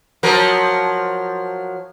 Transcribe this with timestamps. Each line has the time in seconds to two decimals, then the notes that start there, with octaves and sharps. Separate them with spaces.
0.23 F3 F#3 A#4